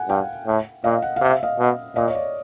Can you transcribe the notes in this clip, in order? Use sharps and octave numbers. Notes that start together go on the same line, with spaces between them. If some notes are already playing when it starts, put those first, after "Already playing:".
Already playing: F#5 G#5
G2 F5 G5
A2
A#2 D#5 F5
F#5
C3 F5
E5
D#5 F5
B2
A#2 D#5 F5
C#5
D5